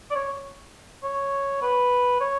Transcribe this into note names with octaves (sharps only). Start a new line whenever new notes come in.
D5
C#5
C#5
B4
C#5